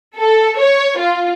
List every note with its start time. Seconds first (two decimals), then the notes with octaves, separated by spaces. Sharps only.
0.17 A4
0.60 C#5
0.99 F4